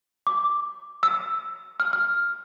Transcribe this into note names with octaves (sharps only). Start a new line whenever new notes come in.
D6
E6
F6
F6